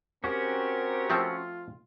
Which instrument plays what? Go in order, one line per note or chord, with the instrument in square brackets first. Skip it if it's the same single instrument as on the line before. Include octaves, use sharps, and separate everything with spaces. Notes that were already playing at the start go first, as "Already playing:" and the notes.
[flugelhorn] C4 [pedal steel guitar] C#4 F#4 [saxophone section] G4 A#4
[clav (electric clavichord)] F3 A3 C4 [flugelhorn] F4